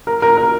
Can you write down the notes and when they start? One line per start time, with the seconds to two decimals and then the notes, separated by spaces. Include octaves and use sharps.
0.07 A#4
0.22 A#4
0.37 A#4